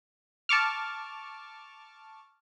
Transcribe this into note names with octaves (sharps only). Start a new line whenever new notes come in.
A5 C#6 D6 F6